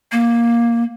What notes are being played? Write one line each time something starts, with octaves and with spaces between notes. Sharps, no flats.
A#3